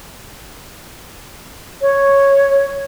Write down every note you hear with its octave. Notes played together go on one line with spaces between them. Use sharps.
C#5